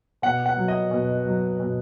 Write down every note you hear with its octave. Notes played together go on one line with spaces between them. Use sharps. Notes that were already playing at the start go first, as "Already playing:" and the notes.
B2 F#5
F#5
F#3
D#5
B2
F#3
B2